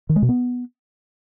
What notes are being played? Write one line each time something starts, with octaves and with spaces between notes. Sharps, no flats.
D#3
G#3
B2
B3